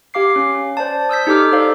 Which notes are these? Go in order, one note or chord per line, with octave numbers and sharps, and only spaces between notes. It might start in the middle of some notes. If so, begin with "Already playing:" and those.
G4 F5 D6 C7
C#4
C5 D5 A5
D#6 E6 G6 B6
D#4 G4 A4 D6 F6
D#4 A4 C5 D5 F5